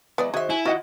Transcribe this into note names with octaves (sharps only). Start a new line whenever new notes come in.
E3 F#3 G#3 B3 D5
D#3 F#4 G#4 C5 E5
E4 G#5
D#3 F4 F#4 D#5 F#5